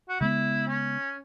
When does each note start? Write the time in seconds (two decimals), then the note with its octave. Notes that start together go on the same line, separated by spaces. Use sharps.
0.09 F#4
0.20 C#3 G#3 B3 E4
0.67 C#4